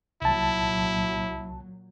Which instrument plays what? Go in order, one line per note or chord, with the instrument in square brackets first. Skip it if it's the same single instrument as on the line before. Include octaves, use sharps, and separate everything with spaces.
[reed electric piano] C2 A5 [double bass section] A#2 F#3 [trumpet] E4